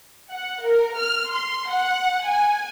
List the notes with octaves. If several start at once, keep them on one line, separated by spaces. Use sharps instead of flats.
F#5
A#4
F6
C6
F#5
G#5